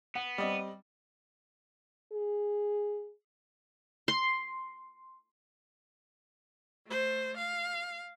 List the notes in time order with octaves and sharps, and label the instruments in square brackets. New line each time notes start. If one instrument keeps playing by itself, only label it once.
[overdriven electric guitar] B3 [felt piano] F#5
[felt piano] G3 C4 [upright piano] D5 D#5
[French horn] G#4
[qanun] C6
[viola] A3 C5
F5